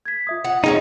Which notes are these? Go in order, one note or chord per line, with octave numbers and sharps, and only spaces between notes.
G#6 B6
F4 E5 D#6
F#5
G#3 A#3 C#4 D#4